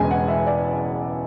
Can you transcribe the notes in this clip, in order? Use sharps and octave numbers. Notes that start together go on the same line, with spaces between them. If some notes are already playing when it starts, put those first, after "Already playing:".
Already playing: E1 E2 C#3 G#3 B3 G#5
F#5
E5
D5